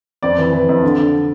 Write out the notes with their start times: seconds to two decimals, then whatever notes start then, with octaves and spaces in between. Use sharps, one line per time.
0.23 F2 D5
0.38 E3
0.53 E3
0.69 F2
0.83 D3
0.98 D3